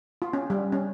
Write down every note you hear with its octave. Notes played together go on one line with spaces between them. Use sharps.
F4
C#4
G3
C#4